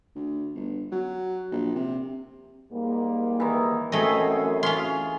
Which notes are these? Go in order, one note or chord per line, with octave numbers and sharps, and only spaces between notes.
D2
G1
F#3
A#1
C3
G#2 G3 A#3
D#3 E3
F#2 A3 C4 G#4 D#5
C#4 F4 C6